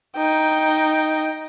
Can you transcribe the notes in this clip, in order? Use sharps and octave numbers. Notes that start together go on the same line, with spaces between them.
D#4 G5